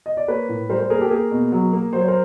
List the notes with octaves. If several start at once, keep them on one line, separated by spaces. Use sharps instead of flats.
D#5
D5
A#3 B4 C#5
A2
G3 A#4 C5
A#4 C5
A#3 G#4 A#4
G4 A4
A#3 G#4 A#4
B2
F#3
A#3
F#3 C5
C#5
A#4 C5